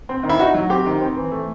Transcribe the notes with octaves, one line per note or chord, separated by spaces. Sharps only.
C4
D#3
E4
D#4 F#4
F#3
C4 G4
D#3
C4
E3
A3